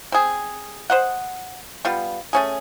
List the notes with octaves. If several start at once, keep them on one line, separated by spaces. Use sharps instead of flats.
C4 G#4
C5 D#5 F#5
G3 B3 F4
A3 C#4 G#4